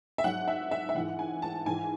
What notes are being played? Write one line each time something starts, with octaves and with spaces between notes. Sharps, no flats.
E5
G#2 F#3 F#5
E5
E5
E5
G#2 E3 F#5
G#5
A5
G#2 E3 G#5